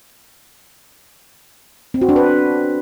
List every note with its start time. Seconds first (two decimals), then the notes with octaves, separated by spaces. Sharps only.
1.94 C4
2.01 F#4
2.09 D4
2.16 B4